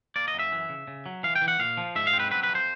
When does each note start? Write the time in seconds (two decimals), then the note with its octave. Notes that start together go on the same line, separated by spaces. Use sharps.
0.16 A#3 D5
0.28 D#5
0.34 F#2
0.39 E5
0.52 E3
0.69 C#3
0.88 C#3
1.06 F#3
1.23 E3 F5
1.36 G5
1.42 E3
1.48 F#5
1.59 A#2 F5
1.77 F3
1.96 G#2 E5
2.07 F5
2.13 C4
2.20 B4
2.31 F#3 B4
2.43 B4
2.49 F2
2.55 C5